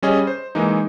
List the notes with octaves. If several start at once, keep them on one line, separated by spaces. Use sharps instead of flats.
G3 C#4 G#4 D#5
C5
E3 G#3 A#3 D#4